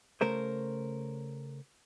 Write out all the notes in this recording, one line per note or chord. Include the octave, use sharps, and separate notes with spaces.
C#3 A3 A#4 C5 C#5